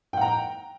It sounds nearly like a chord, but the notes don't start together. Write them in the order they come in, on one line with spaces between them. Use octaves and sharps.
G5 F#5 A#5